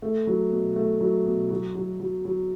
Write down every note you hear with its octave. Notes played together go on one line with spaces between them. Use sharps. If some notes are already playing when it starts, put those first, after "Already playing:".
A3
F#3
B2
A3
F#3
B2
F#3
F#3
F#3
F#3